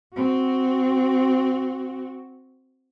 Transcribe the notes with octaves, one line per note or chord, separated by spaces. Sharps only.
C4 F#4